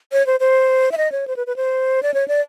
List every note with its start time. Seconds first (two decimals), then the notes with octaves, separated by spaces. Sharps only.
0.12 C#5
0.27 C5
0.40 C5
0.92 E5
0.98 D#5
1.12 C#5
1.28 C5
1.37 B4
1.47 B4
1.56 C5
2.03 D5
2.14 C#5
2.28 D5